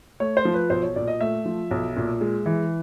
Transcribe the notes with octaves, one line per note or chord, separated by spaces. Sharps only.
A3 C#5
C5
F3
B4
B1 C5
C#5
A#2 D5
D#5
A3 E5
F3
B1
A#2
G#3
E3